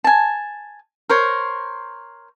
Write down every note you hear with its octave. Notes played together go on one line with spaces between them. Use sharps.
G#5 A5
A#4 C5 C#5